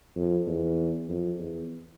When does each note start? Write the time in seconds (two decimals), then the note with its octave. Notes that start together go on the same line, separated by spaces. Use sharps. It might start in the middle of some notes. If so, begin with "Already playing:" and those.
0.16 F2
0.47 E2
1.09 F2
1.39 E2